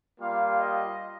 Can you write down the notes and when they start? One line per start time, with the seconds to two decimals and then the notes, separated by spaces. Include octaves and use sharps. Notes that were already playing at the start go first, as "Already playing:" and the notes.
0.20 G3 A#3 F4 F5
0.60 D#5